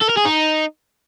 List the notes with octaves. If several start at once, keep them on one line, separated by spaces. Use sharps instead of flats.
A4
A#4
G#4
D#4